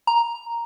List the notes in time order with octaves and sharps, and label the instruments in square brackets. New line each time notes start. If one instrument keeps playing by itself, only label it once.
[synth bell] A#5